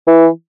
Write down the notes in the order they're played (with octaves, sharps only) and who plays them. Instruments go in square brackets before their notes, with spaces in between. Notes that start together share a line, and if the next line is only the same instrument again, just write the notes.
[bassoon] E3